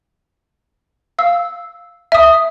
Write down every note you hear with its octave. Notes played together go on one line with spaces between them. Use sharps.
F5 E6
E5 D#6